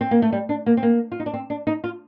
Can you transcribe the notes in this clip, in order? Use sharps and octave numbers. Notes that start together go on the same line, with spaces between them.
C4
A#3
A3
G3
D4
A#3
C4
A#3
F4
D#4
D4
C4
D4
D#4
F4